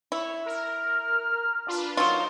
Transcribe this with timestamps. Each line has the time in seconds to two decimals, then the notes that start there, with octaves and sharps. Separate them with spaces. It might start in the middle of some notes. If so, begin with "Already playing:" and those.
0.12 E4 C#5
0.46 A#4 F6
1.67 D4 F4 B4
1.97 F#3 D#4 F4 A#4 C5